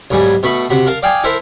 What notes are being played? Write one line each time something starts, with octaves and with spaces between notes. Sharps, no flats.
B1 G#2 G3 G#5
B2 A3 B5 C#6
C3 F#4 B5
A#4 F5 A5
D5 F5 G5 G#5 D#6
E4 A4 A#4 C5 E5